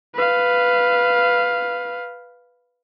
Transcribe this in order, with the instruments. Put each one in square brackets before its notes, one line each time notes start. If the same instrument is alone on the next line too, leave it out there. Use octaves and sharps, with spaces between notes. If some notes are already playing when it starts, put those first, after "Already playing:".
[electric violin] B4 F5